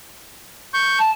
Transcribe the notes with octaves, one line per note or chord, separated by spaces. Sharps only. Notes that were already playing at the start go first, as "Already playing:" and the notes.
C#6 G6
A5